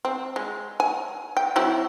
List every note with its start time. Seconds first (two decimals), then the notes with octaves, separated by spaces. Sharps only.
0.05 C4
0.36 G#3
0.80 G#5
1.37 G5
1.56 F#3 C4 E4